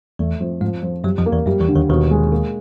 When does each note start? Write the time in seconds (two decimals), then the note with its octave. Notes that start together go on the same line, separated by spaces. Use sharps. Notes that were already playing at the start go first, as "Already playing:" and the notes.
0.19 E2 E3 A3
0.40 F2
0.61 G#2 F3 G#3
0.83 F2
1.04 F#2 F#3 G3
1.18 F2 F3
1.26 A#3
1.33 E2 E3
1.47 F#2 F#3 G3
1.61 E2 E3
1.68 D3
1.76 D#2 D#3
1.89 D#2 B2 D#3
2.11 G#3
2.32 A#3